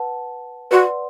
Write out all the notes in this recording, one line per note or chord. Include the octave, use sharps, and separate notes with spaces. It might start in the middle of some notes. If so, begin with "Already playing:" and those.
Already playing: B4 F#5 A5
F#4 B4 D5 F#5 C6